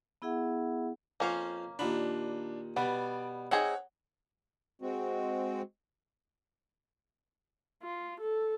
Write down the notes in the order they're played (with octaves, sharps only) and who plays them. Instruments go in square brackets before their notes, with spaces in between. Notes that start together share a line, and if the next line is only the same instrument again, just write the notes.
[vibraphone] B3 E4 G#4 E5 F#5
[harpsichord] F2 C5 F5 [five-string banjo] A#3 C#4
[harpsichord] D#2 A#2 B5 [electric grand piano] D4
[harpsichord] B2 G3 [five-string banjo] B3 [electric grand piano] D5
[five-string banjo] C4 D#4 G#4 [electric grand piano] C#5 F#5
[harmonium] G#3 C4 F#4
[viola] F4
A4